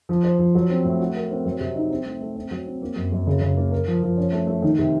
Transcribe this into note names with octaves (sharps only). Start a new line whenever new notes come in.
F3
C5
F3
F#3
C4
A2
F#4
A#4
C4
F#3
C3
D#4
C4
A3
A3
C4
F#3
C4
A#3
F#2
F#2
C#3
C#3
A#3
A#4
F3
F3
C#4
A3
A3
D#3
C3